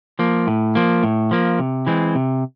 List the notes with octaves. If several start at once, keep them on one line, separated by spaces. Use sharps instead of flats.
F3 A#3
A2
F3 A#3
A2
F3 A#3
C3
E3 G#3 C4
C3